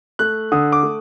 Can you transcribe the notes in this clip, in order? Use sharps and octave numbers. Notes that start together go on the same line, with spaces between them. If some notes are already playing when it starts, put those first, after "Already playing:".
A3 F#6
D3 D#6
D6
A3